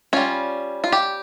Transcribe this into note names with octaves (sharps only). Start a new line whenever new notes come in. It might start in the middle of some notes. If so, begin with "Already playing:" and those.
G3 C#4 F4
F4
G4